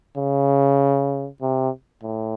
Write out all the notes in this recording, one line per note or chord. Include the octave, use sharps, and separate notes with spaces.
C#3
C3
A2